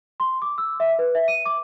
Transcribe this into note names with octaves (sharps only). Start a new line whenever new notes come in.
C6
D6
E6
E5
B4
E5
D#7
D6